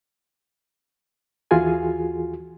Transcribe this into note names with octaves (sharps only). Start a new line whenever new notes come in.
D#2 E3 F4 F#4 G#4 G#5